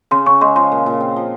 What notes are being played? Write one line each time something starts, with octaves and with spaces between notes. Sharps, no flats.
C#3 C6
C#3 C#6
G#3 C6
F3 C6
A#2
A#2
C4
F3